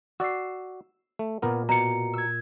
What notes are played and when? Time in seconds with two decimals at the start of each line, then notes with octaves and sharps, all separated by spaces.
0.20 F#4 D5 E6 C7
1.19 A3
1.42 A#2 B3 A#4
1.69 B2 A#5 C#7
2.13 E6 G#6